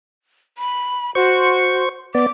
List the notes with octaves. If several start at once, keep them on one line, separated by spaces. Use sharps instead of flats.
B5
F#4 C5 C#6
B3 D5 D6